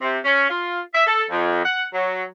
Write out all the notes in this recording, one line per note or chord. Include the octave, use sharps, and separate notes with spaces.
C3
C#4
F4
E5
A4
F2
F#5
F#3